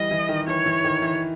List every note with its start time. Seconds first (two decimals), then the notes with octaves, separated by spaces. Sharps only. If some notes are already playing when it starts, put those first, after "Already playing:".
Already playing: E3 G3 D#5
0.11 E3
0.29 D#3
0.47 E3 C#5
0.66 E3
0.84 D#3
1.02 E3